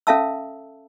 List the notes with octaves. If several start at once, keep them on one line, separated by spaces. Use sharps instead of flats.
C#4 A4 E5 F5 A5 E6